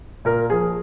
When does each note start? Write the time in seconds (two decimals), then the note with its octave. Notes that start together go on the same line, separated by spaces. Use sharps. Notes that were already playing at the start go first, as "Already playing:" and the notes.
0.25 A#2 A#4
0.50 F3 G#4